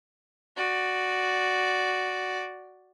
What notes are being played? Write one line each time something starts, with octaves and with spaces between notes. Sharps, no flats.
F#4 D5